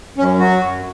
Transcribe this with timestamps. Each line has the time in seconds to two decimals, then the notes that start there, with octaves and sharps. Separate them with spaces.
0.18 F#2 C#4
0.39 F#3 F#4
0.60 F#2